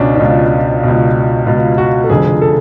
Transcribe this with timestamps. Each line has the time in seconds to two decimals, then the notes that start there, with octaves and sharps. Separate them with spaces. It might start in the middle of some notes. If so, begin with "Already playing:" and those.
Already playing: C#2 B2 C#4 D4
0.15 D4
0.19 C#2 B2 F4
0.83 C#2 B2
1.46 C#2 B2 F4
1.78 F#4
2.04 A4
2.10 F1 F2 D3 G#4
2.42 A4